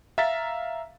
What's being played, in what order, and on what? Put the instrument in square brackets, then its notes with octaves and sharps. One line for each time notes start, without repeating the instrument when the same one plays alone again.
[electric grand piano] E5 F5 A#5 A6 B6